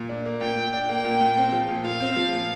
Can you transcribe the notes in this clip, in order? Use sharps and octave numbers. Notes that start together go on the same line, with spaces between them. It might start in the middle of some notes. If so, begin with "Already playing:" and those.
Already playing: A#2
D4
A#3
A#2 G5
A#2
D4
A#3 G5
A#2
A#2
C4
F3
A#2
F4 F5
C4
F3
A#2